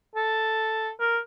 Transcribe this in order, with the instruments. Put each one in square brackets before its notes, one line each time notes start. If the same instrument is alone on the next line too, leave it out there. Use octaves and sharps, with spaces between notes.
[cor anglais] A4
A#4